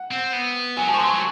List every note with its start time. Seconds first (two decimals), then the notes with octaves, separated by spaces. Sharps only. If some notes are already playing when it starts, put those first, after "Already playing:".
Already playing: F#5
0.11 C4
0.33 B3
0.76 F#3 G#5
0.88 F3 A5
0.94 C#6
0.98 F#3 C6
1.10 A3 C#6